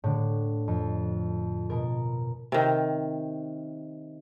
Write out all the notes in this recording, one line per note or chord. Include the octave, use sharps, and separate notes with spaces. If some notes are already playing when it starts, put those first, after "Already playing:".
A2 D3
F2
B2 A#4
C3 D#3